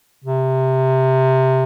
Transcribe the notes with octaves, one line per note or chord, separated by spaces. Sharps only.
C3